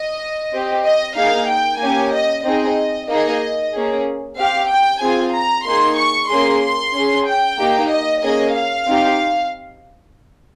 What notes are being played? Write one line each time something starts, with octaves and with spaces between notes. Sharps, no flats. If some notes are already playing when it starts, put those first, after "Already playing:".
Already playing: D#5
C4 G4
D#5
A#3 D#4 G#4 F5
G5
A#3 C#4 G4 G#5
D#5
C4 D#4 G#4 D#5
A#3 D#4 G#4 D#5
A#3 C#4 G#4
C4 G4 F5
G5
C4 F4 G#4 G#5
A#5
A#3 D#4 G#4 C6
C#6
A#3 C#4 G#4 C6
C6
C#4 G#4
G5
A#3 D#4 G4
D#5
A#3 C#4 G#4 D#5
F5
C4 D#4 G4